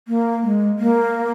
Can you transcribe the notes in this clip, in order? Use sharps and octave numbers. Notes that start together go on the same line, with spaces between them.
A#3
G#3
A#3